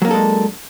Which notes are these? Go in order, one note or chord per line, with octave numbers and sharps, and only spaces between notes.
F#3 G#3 A#3 D4 A4